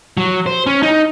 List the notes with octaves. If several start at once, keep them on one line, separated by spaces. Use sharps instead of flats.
F#3
C5
C#4
D#4